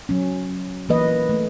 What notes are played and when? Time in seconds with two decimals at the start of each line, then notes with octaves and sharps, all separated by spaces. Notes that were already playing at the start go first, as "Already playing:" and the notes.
0.09 F#3 C#4
0.89 E3 A#3 B4 D#5
1.29 A3